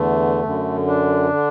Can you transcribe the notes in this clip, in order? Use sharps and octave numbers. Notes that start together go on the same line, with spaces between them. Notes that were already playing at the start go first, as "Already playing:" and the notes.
Already playing: E2 D3 A3
F#2 D3
D4
D3